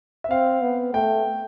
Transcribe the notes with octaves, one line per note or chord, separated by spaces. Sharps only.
E5
C4 F5
B3
A3 G5